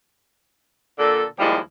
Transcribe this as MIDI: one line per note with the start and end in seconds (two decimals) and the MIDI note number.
0.99 1.24 46
0.99 1.24 50
0.99 1.24 69
1.39 1.58 39
1.39 1.58 53
1.39 1.58 55
1.39 1.58 56
1.39 1.58 64